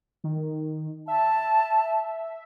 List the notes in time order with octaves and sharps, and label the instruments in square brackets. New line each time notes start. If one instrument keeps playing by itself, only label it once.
[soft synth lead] D#3
[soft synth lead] E5 [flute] A5